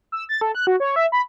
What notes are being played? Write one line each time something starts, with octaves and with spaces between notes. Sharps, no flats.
E6
A6
A4
F#6
F#4
C#5
E5
B5